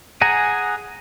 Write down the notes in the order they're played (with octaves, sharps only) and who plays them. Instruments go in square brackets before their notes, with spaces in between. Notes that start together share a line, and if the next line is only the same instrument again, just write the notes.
[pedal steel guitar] G#4 F#5 G#5 A#5